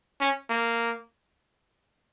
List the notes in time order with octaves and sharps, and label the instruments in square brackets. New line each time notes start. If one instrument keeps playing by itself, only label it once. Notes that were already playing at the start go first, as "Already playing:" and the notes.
[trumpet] C#4
A#3